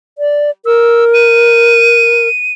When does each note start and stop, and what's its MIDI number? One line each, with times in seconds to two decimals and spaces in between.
0.18 0.51 74
0.66 2.28 70
0.66 1.05 88
1.14 2.53 99